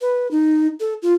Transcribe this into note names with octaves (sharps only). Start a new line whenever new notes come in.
B4
D#4
A4
F4